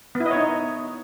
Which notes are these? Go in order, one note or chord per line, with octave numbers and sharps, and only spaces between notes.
B3
E4
D#5
C#5
D#4